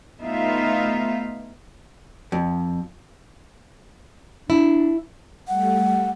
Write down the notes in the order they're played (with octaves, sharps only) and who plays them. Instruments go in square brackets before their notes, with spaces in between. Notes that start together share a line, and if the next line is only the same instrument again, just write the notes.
[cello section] A3 B3 D#4 F4 E5 F5
[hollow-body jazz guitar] F2
[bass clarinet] D4 [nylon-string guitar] E4
[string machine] G3 A3 [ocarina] F#5